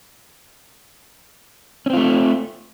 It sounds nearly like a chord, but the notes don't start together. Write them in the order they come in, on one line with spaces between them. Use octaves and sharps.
C#4 C4 F4 A3